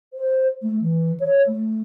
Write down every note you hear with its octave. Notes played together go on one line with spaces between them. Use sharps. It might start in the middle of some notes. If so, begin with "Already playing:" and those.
C5
A3
E3
C#5
A3